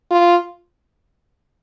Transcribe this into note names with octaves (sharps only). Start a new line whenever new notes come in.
F4